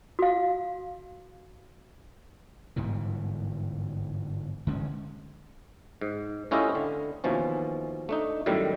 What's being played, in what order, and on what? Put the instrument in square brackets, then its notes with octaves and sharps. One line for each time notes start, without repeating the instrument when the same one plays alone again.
[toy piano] F#4 F5
[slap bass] G1 G#2 B2 E3
D3 G#3 C4 C#4
[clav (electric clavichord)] G#2
A2 C#4 E4 F4 G4 D#5
D3
D#2 B2 E3 F3 C#4
A3 D4 D#4
F#2 A2 D#3 G3